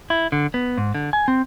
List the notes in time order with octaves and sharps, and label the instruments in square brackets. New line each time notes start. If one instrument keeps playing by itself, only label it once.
[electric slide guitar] E4
D3
B3
G#2
D3
G#5
C4